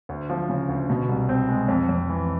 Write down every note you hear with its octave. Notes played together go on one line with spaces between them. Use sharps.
D2
F3
C#3
D2
B2
C2
C4
G#3
F2
F2
E3